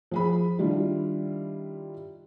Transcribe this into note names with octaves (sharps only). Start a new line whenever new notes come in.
F3 G#4 B5
D#3 G3 D4 E4 F4